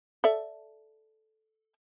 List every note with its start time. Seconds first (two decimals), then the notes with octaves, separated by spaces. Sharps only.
0.24 A4 D5 E5